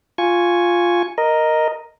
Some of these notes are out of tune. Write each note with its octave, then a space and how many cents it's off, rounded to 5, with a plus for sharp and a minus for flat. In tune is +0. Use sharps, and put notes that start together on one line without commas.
F4 +0 G#5 +0 C#6 +0
A#4 +0 D#5 +0